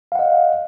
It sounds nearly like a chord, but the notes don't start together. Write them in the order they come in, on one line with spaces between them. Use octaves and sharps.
F5 F#5 D#5